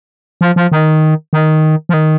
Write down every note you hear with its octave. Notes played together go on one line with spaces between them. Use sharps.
F3
F3
D#3
D#3
F3
D#3